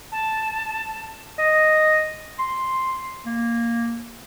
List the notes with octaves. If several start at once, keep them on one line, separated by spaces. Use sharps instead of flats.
A5
D#5
C6
A#3